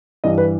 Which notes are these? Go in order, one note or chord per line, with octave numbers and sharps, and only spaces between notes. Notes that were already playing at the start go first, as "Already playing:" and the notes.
G2 E3 D#5
B4